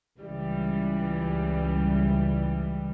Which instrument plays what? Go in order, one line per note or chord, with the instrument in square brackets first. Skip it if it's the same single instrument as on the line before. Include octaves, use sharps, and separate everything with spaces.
[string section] C#2 E3 G3